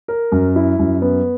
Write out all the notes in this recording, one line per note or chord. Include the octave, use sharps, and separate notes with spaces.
A#4
F#2
E4
F#2
B3